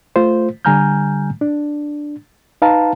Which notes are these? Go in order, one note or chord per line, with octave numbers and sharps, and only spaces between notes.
A3 F4 C5
D3 G3 G#5 A#5 F6 G6
D4
D#4 B4 F5 A5 A#5